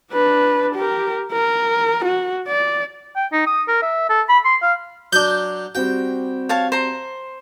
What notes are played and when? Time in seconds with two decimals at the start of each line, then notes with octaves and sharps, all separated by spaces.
0.12 D4 B4
0.75 G4 A#4
1.32 A#4
2.05 F#4
2.47 D5
3.16 G5
3.32 D#4
3.47 D#6
3.68 A#4
3.82 E5
4.09 A4
4.29 B5
4.45 C6
4.62 F5
5.12 F#3 D4 G6
5.75 G3 C4 F#4 G5
6.49 C#5 F5 A5
6.72 C5 A#5